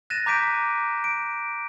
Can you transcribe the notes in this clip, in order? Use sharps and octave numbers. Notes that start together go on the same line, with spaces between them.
F#6 A6 A#6 D#7 E7
A#5 D6 G6 B6 D7 D#7
D7